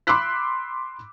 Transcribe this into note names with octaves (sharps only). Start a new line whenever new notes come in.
B5 C6 D6 E6 F#6 B6